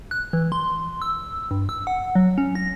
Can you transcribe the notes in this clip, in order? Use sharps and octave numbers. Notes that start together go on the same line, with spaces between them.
F#6
E3
C6
E6
G2
E6
F#5
F#3
C#4
A#6